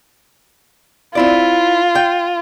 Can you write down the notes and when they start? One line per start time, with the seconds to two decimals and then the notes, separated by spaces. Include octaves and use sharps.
1.15 C4 E4 F4 D5
1.95 G5